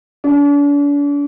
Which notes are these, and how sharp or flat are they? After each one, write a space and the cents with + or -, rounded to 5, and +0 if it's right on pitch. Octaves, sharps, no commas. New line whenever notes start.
D4 -40